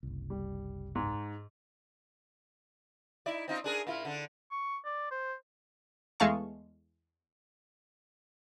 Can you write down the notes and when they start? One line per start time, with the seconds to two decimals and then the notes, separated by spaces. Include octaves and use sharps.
0.03 F#1 C2
0.30 G3
0.95 G#2
3.26 D#4 E4 D5
3.48 C4 D#4 F4
3.64 D4 G#4 A#4
3.87 A#2 E4 F4
4.05 D3 D4
4.51 C#6
4.85 D5
5.11 C5
6.20 E2 G#3 A3 F5 A5 C#6